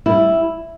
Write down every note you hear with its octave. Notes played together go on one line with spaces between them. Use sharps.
G3 E4